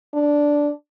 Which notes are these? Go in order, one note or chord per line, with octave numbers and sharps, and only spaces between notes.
D4